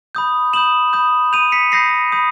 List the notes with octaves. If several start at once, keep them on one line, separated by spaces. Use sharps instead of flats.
B5 D#6 G6
B5 D#6 G6 E7 F#7
B5 D#6 G6
B5 D#6 G6 D#7 F7
B6 C#7
B5 D#6 G6 A#6 C7
B5 D#6 G6